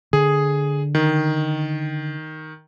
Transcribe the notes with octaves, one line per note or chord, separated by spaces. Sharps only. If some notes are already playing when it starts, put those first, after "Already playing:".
D3 G#4
D#3